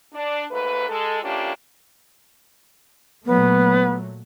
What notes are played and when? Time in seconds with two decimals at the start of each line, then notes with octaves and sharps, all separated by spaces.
0.14 D4
0.51 D#2 G#2 A3 B4
0.89 G#3 A4
1.23 A3 A#3 C#4 D4 F4 G4
3.25 A#2 F#3 A3 B3